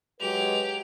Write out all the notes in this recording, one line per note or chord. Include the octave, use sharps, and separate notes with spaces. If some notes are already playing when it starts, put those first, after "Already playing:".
F#3 G#3 G4 B4 F7